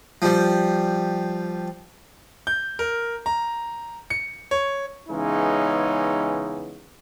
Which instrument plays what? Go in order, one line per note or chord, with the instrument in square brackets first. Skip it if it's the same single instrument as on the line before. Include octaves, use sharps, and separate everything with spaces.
[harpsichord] F3 G3
[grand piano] G6
A#4
A#5
C#7
C#5
[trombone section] C#3 E3 G#3 B3 C#4 D#4